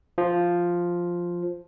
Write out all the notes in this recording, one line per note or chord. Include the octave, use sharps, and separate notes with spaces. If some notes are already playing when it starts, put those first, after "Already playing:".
F3